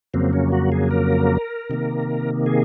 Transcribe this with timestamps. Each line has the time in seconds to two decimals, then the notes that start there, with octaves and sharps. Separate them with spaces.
0.14 F2 C#3 F#3 A#3 C4
0.33 C#4
0.52 F#4
0.72 G#4
0.91 A#4
1.69 C3 D#3 A#3
2.46 G#4